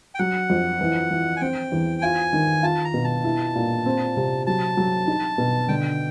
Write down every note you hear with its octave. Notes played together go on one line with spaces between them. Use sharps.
G5
F#3 F#5
F2
E3
E3
G#5
C4 G5
E2
F4 G#5
D#3
F4 A5
A#5
B2
A5
E4
A#2
C4
C3
F#3 A5
F#3
D#4
B2
D3 G5